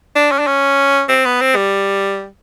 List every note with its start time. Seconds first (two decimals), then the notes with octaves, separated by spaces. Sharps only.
0.16 D4
0.31 C#4
0.39 D4
0.47 C#4
1.09 C4
1.25 B3
1.41 C4
1.56 G3